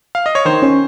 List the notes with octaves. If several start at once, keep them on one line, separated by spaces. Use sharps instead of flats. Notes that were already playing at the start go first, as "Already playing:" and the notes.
F5
D#5
C#5
D#3 C5
C#4